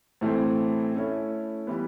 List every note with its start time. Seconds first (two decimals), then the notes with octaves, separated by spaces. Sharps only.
0.21 A2 E3 A3 C4
0.95 A3 C#4 E4
1.67 E3 G3 B3